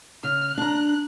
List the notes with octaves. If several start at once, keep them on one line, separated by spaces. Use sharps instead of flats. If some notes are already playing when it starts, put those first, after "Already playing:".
C#3 F6
D4 A#5 F#6